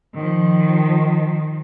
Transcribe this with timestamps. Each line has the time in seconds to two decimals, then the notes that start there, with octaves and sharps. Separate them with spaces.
0.14 D#3 F3